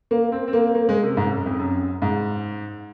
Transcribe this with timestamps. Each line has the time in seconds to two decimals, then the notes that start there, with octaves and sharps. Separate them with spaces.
0.11 A#3
0.32 C4
0.48 C4
0.53 A#3
0.75 A#3
0.89 G#3
1.03 C3
1.17 G#2
1.31 F#2
1.46 F2
1.59 F#2
2.02 G#2